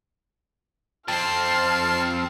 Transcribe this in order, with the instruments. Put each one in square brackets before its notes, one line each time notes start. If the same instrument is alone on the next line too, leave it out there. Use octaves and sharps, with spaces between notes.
[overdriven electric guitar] F2 C4 [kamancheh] C5 F6 [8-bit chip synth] A5 C7